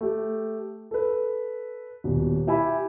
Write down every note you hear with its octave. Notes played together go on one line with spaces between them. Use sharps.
A3 G4
A4 B4
D#1 B2
E4 G4 E5 G#5 B5